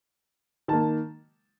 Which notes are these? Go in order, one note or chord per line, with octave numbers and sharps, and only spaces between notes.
D#3 A#3 A5